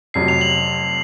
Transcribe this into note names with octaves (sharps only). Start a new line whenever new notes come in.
F1 F2 C3 F#3 C7
F7
F#7